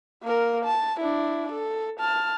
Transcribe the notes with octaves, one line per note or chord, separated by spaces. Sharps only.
A#3 A#4
A5
D4 E4
A4
A5 F6